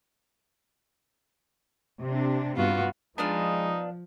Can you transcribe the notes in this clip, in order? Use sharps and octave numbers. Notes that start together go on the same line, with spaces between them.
C3 D4
G2 B3 F4 F#4
F3 G#3 B3 D4 D#4 F4